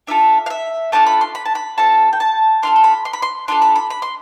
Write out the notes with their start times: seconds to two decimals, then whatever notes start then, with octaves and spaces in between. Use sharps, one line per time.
0.07 D4 F4 A4 E5
0.46 F5
0.50 E5
0.92 A3 D4 F4 A4 A5
1.06 B5
1.21 C6
1.35 B5
1.46 A5
1.55 B5
1.78 C4 F4 A4 A5
2.13 G5
2.20 A5
2.63 D4 F4 A4 C6
2.76 C6
2.84 B5
3.05 C6
3.13 B5
3.22 C6
3.48 D4 F4 A4 C6
3.62 B5
3.76 B5
3.90 B5
4.02 C6